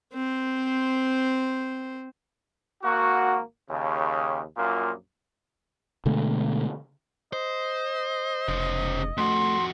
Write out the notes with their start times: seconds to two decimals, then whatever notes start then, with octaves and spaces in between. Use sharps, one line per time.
0.13 C4 C5
2.82 G#1 A#3 F#4
3.69 D#2 C#3
4.57 A#1 F#2 A#2 A#3 F4
6.05 B2 D3 G#3 A3
7.33 C5 D#5
8.48 F1 C#3 C5
9.17 F2 A3 F#4 C6